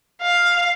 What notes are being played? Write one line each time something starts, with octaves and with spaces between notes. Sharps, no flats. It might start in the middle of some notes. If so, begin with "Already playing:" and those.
F5